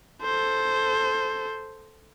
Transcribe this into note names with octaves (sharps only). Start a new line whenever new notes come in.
A4 C5